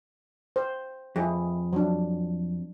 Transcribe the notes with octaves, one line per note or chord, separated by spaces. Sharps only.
C5
F2 E4 G#4
F#3 D4